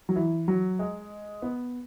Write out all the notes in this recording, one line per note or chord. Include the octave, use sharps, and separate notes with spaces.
F#3
E3
F#3
G#3
B3